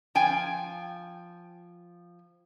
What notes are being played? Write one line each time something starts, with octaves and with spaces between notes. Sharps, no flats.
F3 G5 G#5